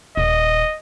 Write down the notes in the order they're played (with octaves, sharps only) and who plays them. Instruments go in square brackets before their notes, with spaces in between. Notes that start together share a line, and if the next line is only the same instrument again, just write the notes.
[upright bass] D#1 [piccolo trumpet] D#5